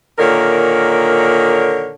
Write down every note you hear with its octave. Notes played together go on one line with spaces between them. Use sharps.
A#2 D3 D#3 A#4 C#5